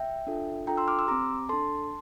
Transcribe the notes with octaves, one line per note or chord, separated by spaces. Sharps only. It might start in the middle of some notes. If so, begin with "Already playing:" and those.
Already playing: E5 G5
D4 F4 A4
D4 F4 A4 G5 A#5
C6 E6
D6 F6
C6 E6
C4 G4 A#5 D6
D4 A4 A5 C6